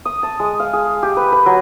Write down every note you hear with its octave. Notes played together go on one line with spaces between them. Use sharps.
D#6
A5
G#3
F5
G#4
G4
B4
B4
F#3